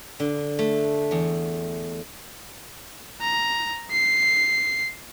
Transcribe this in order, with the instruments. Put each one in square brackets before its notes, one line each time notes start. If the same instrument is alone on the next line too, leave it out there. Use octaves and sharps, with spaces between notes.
[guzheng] D3
A3
E2
[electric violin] A#5
C7